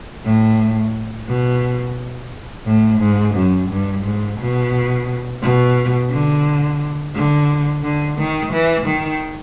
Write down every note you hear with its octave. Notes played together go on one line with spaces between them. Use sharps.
A2
B2
A2
G#2
F#2
G2
G#2
B2
B2
D3
D3
D3
D#3
E3
D#3